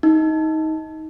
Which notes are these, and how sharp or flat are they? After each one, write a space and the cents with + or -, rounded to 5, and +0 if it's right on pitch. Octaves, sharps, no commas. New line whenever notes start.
D#4 +20